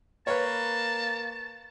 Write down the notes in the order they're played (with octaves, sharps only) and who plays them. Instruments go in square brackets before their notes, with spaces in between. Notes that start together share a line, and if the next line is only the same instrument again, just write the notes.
[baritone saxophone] A#3 [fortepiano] B4 C#5 [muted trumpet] A5